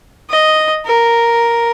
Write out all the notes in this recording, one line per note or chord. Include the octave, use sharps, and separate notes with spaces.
D#5
A#4